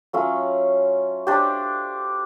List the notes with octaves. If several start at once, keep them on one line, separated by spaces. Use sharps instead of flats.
F#3 A3 C#4 F4
D4 G4 C5